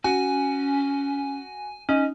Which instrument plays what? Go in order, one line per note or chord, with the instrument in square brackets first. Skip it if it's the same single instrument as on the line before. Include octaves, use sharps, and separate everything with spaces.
[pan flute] C#4 [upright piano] F#4 [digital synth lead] G#5
[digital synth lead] C#4 [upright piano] D#4